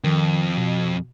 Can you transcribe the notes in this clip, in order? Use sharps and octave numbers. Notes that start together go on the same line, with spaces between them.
F2 D#3
B2